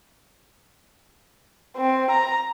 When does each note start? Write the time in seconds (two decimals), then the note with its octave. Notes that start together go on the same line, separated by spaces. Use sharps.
1.78 C4
2.11 A#5